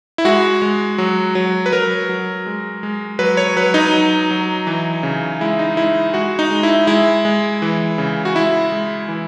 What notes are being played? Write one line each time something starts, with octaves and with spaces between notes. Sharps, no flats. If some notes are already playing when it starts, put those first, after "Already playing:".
E4
G#3 F#4
G#3
F#3
F#3
B4
F#3 A#4
F#3
G#3
G#3
F#3 B4
C#5
F#3 B4
D#4
F#3
F#3
E3
C#3
G#3 E4
D#4
G#3 E4
G#3 F#4
D#4
G#3
E4
G#3 E4
G#3
E3
C#3
F#4
G#3 E4
G#3
E3